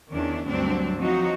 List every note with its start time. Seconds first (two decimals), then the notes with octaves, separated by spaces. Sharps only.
0.12 E2 D#3 C#4 D4
0.47 D2 G2 F#3 C4 D4
0.98 F3 F#3 C4 D#4 F#4